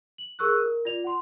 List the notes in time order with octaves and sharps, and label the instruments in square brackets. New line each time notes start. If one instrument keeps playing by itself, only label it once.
[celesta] F#7
G#4 A#4 C#6 E6 F#6
A#4
F4 D5 F7
F#5 C6